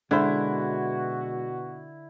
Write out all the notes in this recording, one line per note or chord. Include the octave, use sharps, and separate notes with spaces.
B2 D3 G#3 E4 F#4 C5